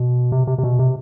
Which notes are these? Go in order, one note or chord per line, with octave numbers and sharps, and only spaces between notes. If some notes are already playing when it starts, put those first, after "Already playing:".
Already playing: B2
C3
C3
C3
B2
C3